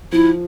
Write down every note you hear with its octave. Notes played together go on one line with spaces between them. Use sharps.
F3 E4